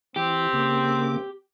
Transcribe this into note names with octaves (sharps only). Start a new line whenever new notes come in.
E3 C4 G4
C#3 A#3 D6